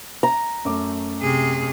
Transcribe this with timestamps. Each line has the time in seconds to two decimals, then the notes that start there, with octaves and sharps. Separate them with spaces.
0.23 A#5
0.65 F#2 A3 D6
1.22 C3 G#4